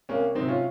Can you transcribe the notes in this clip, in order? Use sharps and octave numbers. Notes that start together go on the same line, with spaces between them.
C2 A#3 C#4
C3 F#3 C4 D#4
C#4 F4